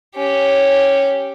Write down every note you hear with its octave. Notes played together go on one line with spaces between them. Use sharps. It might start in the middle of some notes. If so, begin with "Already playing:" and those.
C#4 G4